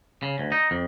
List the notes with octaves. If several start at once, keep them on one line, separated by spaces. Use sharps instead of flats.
C#3
D2
D#4
F2